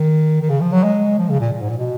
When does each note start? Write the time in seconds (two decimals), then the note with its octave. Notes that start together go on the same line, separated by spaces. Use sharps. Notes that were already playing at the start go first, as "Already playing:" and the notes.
Already playing: D#3
0.42 D#3
0.50 C#3
0.61 F3
0.72 F#3
0.84 G#3
1.18 F3
1.29 C#3
1.40 A#2
1.52 A#2
1.61 G#2
1.69 A#2
1.78 B2